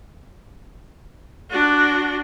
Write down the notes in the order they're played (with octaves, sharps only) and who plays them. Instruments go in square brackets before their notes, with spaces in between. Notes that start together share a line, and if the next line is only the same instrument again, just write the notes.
[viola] D4 F#4